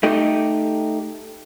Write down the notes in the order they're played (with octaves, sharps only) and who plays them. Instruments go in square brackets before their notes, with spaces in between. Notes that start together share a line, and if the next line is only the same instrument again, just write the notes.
[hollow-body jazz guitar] A3 D#4 G4